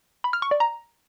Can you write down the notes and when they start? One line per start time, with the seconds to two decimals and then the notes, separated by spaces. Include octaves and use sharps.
0.24 B5
0.33 F6
0.42 C#6
0.51 D5
0.60 A#5